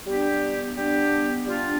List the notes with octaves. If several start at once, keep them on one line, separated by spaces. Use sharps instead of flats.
G3 B3 D4 G4
G3 B3 D4 G4
G3 B3 D4 F4